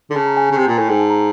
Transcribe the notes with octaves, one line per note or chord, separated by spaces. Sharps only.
D3
C#3 A5
A#5
G#5
G#5
C#3
C3 G#5
A#2 G5
A2 G#5
G#2 G5
A5
A#5